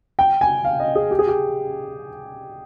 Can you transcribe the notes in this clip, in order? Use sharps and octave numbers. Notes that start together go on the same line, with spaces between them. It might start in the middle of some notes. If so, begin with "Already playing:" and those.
G5
G#5
F5
D#5
G#4
G4
G#4
G4